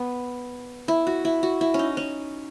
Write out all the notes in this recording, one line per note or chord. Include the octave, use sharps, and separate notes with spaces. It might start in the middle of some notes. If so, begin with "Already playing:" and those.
Already playing: B3
E4
F#4
E4
F#4
E4
C#4
D#4
C#4